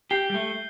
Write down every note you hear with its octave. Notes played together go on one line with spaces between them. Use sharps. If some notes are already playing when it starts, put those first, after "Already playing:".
G4 G6 C7 G7
G3
A3